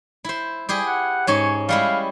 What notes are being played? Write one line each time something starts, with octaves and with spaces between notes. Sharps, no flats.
E4 C5
G3 E4 G4 G#4
F#5
G#2 C#4 C#5 G#5
G3 G#3 E4 F5